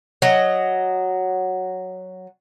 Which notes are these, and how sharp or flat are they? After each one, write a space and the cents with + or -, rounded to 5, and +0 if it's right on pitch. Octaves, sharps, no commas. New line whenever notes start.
F#3 +0 D#5 -5